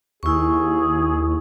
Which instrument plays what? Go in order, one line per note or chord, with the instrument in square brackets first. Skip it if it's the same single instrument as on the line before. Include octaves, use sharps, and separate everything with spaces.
[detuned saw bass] D#2 [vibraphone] E4 C#6 [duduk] G#4